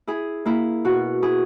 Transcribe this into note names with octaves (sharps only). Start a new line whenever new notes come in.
E4 G#4
A#3 E4
B2 F#4
E4 G#4